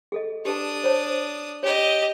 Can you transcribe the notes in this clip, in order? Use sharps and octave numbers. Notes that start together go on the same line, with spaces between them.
G#4 A4 D#5
D4 G4 B4 A5 D#6
C5 C#5 A5
G4 C#5 D#5